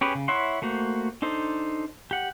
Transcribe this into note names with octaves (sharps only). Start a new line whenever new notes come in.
C#4 G4 G#4 B4
C#3
E4 C#5 E5 F#5 C6
A3 A#3 F#4 C5
D4 D#4 A4 C5
G4 F#5